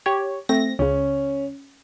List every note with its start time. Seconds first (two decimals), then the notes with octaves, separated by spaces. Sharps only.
0.06 G4 C#5
0.49 A3 C4 A#6
0.79 C#2 C#3 C#4